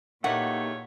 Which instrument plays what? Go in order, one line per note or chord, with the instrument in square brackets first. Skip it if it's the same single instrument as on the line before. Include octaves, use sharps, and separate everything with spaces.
[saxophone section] E2 A3 C#5 [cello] A#2 [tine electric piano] A#3 D#4 G4 [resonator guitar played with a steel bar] F#5